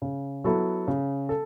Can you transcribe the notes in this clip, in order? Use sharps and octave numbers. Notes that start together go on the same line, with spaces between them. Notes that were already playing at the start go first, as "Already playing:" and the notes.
C#3
F#3 B3 E4 A4
C#3
A4